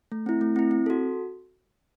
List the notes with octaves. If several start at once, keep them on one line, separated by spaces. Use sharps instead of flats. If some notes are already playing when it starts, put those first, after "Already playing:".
A3
C4 E4
A3
C4 E4
C4
F#4 A4